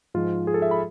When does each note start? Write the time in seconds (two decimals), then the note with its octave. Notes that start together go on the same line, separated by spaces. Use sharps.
0.14 G#2 F3 G#3 F4
0.47 G#4
0.54 A4
0.62 E5
0.71 B5